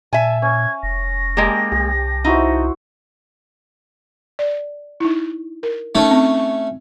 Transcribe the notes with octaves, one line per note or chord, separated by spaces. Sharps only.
A#2 E5 G#5 A5
C#4 G#6
F1 A#6
G#3 A#3 G4 G5 A5
C2 G4
D#4 E4 F#4 C5
D5
D#4 E4
A#4
A3 C#4 D#4 A5
C4